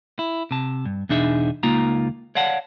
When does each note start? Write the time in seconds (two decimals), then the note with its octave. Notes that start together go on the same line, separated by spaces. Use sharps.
0.19 E4
0.51 C3 A5
0.85 G2
1.09 E2 B2 D4 D#4 G#4 E5
1.63 C#2 A#3 D#4 F4 A#5
2.35 C#5 D5 F5 F#5 A5